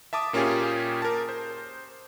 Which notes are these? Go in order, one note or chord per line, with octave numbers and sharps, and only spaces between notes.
E5 A5 D6 D#6
A#2 A#3 C#4 F4 G4 G#4
A#4 A5
C5